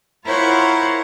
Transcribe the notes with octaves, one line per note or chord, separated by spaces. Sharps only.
E4 F4 A#4 C5 C#5 F#5